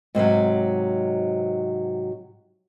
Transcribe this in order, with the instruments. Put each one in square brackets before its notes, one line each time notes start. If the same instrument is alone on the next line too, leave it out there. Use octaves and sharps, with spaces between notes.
[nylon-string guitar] G#2 C3 E3 F#3